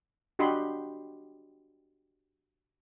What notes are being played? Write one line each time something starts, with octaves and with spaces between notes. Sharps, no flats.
D4 F#4 G4 D#5 B5 C6